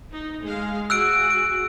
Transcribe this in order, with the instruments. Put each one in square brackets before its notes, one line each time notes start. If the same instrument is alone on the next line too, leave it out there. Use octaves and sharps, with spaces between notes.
[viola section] D#4
G#3 F5
[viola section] F#4 G#4 [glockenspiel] E6 F#6 D7
[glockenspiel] D7